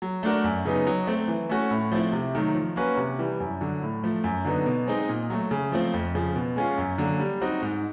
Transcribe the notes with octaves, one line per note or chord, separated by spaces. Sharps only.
F#3
A3 D4 F#4 A#4
F#2
C#3 F#3 B3 D#4
F#3
A3 C4
E3
A3 C#4 F#4
A2
F3 A3 C4 E4
C3
D#3 F#3 A3
F3
A#3 C#4 F#4 B4
C3
E3 G3
F#2
D3 F#3
A2
F3 A3
F#2
D3 F#3 B3 D#4
B2
G#3 C4 D#4
A#2
F#3 A3
C#3
F3 A3 C4 F4
F2
C#3 F3
B2
G#3 C#4 F4
F#2
D3 F#3 A#3
G3
C4 D#4 F#4
G#2